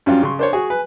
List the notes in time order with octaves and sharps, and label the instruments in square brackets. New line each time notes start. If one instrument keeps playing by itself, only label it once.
[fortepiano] G2 F#3 F4 [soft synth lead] C#4
[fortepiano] C#3 C6 [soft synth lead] C#6
[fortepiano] D4 C5 C#5 [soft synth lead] A#4
[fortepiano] F#4 G#4 [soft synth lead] C#6
[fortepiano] B4 [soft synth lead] G#5